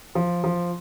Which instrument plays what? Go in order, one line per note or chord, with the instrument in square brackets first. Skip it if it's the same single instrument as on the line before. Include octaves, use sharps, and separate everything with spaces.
[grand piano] F3
F3